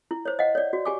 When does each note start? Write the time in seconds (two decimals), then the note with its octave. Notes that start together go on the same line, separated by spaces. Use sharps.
0.11 E4
0.25 C5 C#5
0.39 D#5 F5 F#5
0.55 C#5 D5
0.73 F#4
0.85 G4 G#5 D6